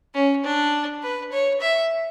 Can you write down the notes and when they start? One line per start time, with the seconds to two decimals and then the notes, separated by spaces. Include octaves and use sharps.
0.14 C#4
0.44 D4
1.02 B4
1.32 C#5
1.61 E5